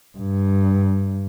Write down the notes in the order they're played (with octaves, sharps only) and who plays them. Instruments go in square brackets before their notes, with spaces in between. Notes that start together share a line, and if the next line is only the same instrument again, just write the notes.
[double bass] G2